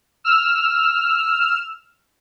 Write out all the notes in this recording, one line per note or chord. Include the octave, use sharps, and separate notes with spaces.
E6 F6